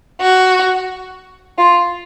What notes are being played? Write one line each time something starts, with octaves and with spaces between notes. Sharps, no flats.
F#4
F4